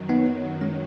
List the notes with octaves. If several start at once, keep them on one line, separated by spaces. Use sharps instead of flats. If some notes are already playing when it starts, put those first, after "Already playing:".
Already playing: F#2 D#3 F#3
B3 D#4
G#3 C#4